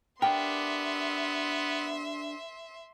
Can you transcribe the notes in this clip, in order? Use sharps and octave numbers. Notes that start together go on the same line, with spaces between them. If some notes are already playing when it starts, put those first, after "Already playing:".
B3 D4 G4 A#4 E5 G5 C6